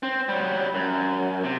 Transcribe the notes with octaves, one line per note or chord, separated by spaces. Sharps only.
C4
F#3 G3
F#2
C3